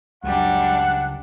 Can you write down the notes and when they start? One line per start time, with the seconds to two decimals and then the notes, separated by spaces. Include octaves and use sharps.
0.24 C#2 F#2 G3 D4 F#5